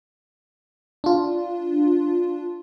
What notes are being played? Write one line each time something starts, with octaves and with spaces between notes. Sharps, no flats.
D4 F4